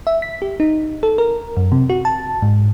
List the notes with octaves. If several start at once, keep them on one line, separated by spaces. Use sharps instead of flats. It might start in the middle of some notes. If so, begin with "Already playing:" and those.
E5
B6
G4
D#4
A4
A#4
F#2
C3
F#4
A5
G#2